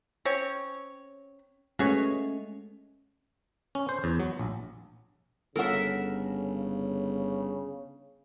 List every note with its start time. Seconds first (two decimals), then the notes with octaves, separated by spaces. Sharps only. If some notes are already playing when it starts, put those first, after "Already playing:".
0.25 C4 C#4 C#5
1.79 B2 G#3 A3 C#4 G#4 C#5
3.75 C#4
3.89 C5
4.04 E2
4.20 F#3
4.39 A#1
5.56 G1 C#3 A4 A#4 E5 F#5